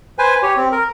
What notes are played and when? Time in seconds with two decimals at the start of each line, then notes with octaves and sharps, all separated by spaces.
0.19 B4 C5 G#5
0.43 G4 C#5
0.57 C4
0.72 A#4